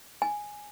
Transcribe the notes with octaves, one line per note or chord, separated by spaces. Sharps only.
G#5